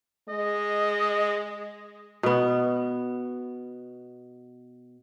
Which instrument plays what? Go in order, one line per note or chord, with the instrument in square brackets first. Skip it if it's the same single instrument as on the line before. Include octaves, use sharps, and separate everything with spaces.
[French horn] G#3 [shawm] D#5
[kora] B2 B3